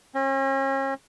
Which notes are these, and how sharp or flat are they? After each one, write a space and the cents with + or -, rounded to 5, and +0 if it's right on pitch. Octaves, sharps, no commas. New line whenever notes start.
C#4 -40